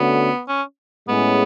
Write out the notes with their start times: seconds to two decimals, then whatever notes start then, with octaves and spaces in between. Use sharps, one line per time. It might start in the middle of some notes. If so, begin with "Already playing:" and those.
Already playing: D3 A3 B3 C#4 F#4
0.48 C#4
1.08 A2 G#3 B3 C#4 G#4